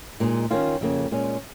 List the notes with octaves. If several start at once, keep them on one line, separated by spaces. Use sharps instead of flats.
A#2 G#3 D#4
D#3 C#4 F4
F2 C#3 A#3
A#2 G#3 C#4